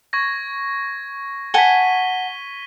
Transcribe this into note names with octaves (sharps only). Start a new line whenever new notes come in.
C#6 G#6 A#6
F#5 G#5 A5 B6 D#7 G7